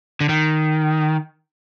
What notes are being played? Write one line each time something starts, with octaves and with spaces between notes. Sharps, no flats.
D3
D#3